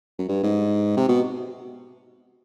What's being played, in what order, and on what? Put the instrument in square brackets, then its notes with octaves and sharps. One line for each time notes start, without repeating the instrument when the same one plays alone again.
[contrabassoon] F#2
G2
G#2
C3
B2